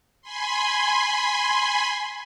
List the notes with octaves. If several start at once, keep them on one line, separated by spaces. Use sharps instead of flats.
G#5 B5 C6